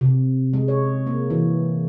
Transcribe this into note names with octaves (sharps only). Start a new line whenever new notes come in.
C3
G#3
C#5
A#3
E3